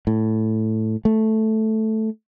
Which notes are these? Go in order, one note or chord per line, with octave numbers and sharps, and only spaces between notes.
A2
A3